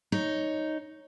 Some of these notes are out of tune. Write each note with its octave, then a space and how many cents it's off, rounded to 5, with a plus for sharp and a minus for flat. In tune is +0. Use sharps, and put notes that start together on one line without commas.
D#4 +0 C#5 +0